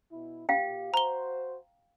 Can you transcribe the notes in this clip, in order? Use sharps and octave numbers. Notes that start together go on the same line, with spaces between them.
B2 E4
A#2 G4 F5 G5
F#4 C5 A#5 G7